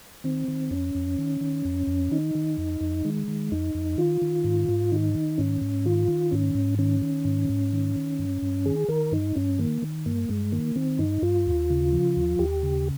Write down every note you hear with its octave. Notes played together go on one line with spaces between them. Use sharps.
D#3 C4
D#3
F2 C#4
F2
D#3
D#3
F2
F2
D#3 D#4
D#3
F2
F2
D#3 G#3
D#3
F2 D#4
F2
D#3 F4
D#3
G#2
G#2
D#3 D#4
D#3
G#2 C#4
G#2
D#3 F4
D#3
G#2 C#4
G#2
D#3 C#4
D#3
G#2
G#2
D#3
D#3
G2
G2
D#3 G#4
D#3 A#4
G2 D#4
G2 C#4
D#3 A#3
D#3
G2 A#3
G2 G#3
D#3 A#3
D#3 C4
G2 D#4
G2 F4
D#2
C#3
F3
D#2
D#2 G4
C#3